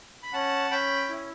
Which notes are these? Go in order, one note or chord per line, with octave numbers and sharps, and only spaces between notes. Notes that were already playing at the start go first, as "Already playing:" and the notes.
B5
C#4 F#5 A5
C#4 G5 B5
E4